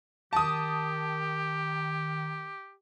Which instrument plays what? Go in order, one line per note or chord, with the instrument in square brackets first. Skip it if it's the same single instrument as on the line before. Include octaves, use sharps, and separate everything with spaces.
[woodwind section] D#3 [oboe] G4 [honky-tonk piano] A5 D#6